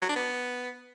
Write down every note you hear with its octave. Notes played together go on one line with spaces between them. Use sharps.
F#3
D4
B3